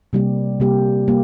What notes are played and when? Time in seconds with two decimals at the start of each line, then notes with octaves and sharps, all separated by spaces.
0.13 C3 G3 A#3 G4
0.60 C3 G3 A#3 G4
1.07 C3 G3 A#3 G4